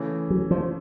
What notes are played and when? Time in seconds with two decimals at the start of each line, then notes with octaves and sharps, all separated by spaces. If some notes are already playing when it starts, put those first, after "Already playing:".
Already playing: C#3 E3 A3
0.30 F#3
0.51 F3